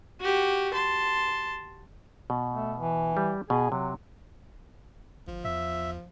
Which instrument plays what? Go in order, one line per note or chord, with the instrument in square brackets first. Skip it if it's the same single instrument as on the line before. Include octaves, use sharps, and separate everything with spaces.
[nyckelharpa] F#4 G4
A5 C6
[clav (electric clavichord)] B2
[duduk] A3
E3
[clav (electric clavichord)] G3
[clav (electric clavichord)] B2 [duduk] G#4
[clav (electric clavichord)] C3 [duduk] F#3
[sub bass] G1 [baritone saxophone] F3
[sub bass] E2 [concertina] E5